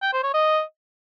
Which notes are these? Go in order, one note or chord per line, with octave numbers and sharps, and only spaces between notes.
G5
C5
C#5
D#5